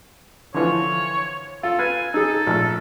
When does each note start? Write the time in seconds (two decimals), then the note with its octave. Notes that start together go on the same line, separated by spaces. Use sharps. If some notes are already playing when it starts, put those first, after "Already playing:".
0.54 D3 E3 F3 C#5
1.63 F4 A4
1.79 B4 F5 G#5
2.14 D#4 G#4 A4
2.47 A#1 A3 E6